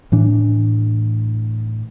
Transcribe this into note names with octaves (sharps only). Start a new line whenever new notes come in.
A2 E3 D4